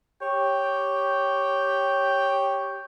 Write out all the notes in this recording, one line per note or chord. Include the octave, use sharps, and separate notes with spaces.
G4 C#5 G5